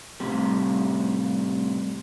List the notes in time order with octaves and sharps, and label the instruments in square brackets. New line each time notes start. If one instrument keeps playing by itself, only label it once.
[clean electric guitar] A2 C3 G3